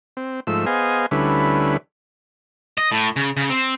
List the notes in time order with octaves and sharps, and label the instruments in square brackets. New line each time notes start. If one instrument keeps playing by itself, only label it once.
[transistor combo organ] C4
G#2 F3 A3 E6
B3 G#4 C5 D#5 F5 G#5
D2 D3 G3 C#4 E4 B4
[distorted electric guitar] D#5
A2
C#3
C#3
C4